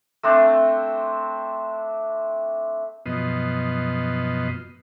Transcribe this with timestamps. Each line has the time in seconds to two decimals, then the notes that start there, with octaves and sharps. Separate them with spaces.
0.23 A3 C4 D4
3.06 F#2 B2 F3 B3 D#5 C6